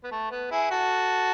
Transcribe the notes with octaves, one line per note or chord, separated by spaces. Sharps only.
B3
A3
B3
E4 G#4
F#4 A4